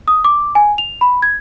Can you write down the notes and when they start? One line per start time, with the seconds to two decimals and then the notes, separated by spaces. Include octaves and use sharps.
0.08 D#6
0.24 D6
0.55 G#5
0.78 F7
1.01 B5
1.22 G#6